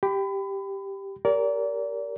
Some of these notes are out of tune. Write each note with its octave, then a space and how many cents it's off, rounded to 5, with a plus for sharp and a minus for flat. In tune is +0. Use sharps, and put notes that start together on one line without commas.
G4 +0 B5 +30
G4 +15 A#4 +0 D5 -35